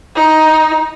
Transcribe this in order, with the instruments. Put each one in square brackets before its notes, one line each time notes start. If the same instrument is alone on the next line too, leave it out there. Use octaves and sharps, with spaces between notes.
[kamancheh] D#4